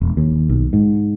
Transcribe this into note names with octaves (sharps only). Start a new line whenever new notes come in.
E1
D#2
B1
G#2